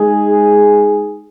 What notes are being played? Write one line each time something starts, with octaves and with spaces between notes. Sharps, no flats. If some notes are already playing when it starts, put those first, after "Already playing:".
Already playing: G#3 D#4 G#4